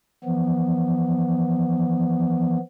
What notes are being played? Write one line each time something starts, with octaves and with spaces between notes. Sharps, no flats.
E3 F3 B3